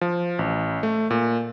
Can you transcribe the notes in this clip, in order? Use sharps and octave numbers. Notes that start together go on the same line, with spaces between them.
F3
A1
A3
A#2